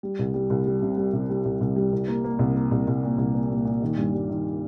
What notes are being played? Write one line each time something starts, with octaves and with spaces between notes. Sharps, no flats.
G3
C2
G3
C2
G3
C3
G3
C3
G3
C2
C2
G3
C2
A#3
A#3
C2
A#3
C2
C2
A#2
C2
A#3
A#2
A#2
D#3
G2
G3
D#3